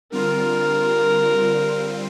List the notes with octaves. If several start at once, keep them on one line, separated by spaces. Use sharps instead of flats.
D3 G3 C4 F4 A#4